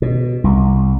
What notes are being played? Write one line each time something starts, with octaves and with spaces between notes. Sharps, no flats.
B2
C2